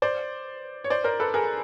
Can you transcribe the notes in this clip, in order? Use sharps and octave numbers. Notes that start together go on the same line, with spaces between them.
C5 D5
C#5
C5 D5
A#4 C5
A4 B4
G#4 A#4